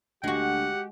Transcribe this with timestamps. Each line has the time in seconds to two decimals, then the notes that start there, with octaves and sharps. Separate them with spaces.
0.24 D2 G#3 F#4 G4 F#5